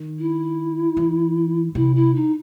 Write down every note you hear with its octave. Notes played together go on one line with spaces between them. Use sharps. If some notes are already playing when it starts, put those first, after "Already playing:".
Already playing: D#3
E4
E3
C3 E4
E4
D#4